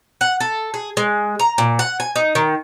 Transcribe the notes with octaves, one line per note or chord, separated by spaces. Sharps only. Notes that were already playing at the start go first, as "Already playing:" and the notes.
F#5
A4
G#4
G#3
A#5
A#2
F#5
G#5
D#4
D#3